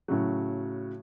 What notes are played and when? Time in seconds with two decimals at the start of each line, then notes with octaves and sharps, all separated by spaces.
0.08 A2 C#3 F#3